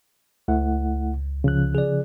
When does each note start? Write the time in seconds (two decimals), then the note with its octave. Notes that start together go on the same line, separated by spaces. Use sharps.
0.48 C#2 A3 E4 F#5
1.44 C#3 F3 F#6
1.75 G#4 D5